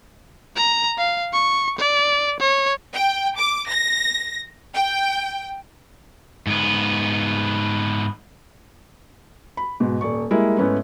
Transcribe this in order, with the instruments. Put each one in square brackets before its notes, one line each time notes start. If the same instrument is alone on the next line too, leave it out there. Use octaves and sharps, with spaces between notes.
[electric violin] A#5
F5
C#6
D5
C#5
[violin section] G5
D6
A#6
G5
[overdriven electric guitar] G#2 B3
[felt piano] B5
G#2 B2
D#1 D5 C#6
G3 G#3 A#3 E4
G#2 A3 B3 C#4 E4